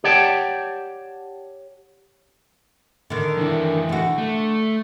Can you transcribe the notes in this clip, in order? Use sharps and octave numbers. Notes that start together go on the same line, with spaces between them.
G4 C#5 D5 F#5 G5 A5
D3 D#3
E3 D4 E4
D3 F#4
A3